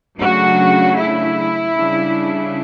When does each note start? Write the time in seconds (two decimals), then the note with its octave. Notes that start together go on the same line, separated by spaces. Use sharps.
0.20 C#3 F#3 A3 D4 F#4
0.98 E4
1.76 C#3 G3 D4